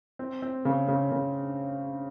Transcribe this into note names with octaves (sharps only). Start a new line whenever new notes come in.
C4
C4
C#3
C#3
C#3